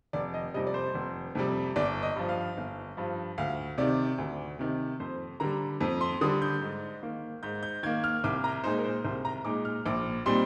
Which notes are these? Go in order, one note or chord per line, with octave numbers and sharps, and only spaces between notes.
F1 D5
D#5
F2 C3 G3 D#5
D5
C5
F1
F2 C3 G3
G1 D5
D#5
G2 F3
F5
G1
G2 F3
D2 F5
C3 D#3 D5
D2
C3 D#3
F2 C5
D3 G3 A#5
F2
C6
D3 G3 D#6
G6
G#2
D#3 A#3
G#2 G6
G6
D#3 A#3 G#6
F6
C2 D6
A#5
A#2 G#3 D#4 C5
A#4
C5
C2 C5
A#5
A#2 G#3 D#4 D6
F6
A#1 D6
A#2 G3 C4 D#4 C6